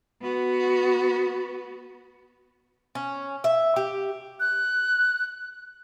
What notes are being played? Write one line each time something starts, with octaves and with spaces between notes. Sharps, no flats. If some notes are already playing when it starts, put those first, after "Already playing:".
B3 F#4
C#4
E5
G4
F#6